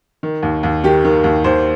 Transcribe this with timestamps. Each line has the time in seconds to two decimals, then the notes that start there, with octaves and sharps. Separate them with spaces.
0.23 D#3
0.43 D#2
0.63 D#2
0.84 D#3 G4
1.05 D#3
1.24 D#2
1.44 D#2 C5